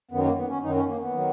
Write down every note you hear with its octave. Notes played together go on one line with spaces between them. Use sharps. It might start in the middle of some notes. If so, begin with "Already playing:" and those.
F#2 D#3 F#3 B3
A#3
B3
C#4
F#2 D#3 F#3 D#4
C#4
A#3
B3
D#3 F#3